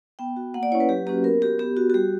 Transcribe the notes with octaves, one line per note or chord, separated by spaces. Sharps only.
B3 G5
F#4
A#3 F#5
D5
C#4 E4 C#5
B4
F#3 G4
A#3 C#4 F#4 G4
B3 A#4
F#4 G4
B3 G4
F#4
F#4
G3 G4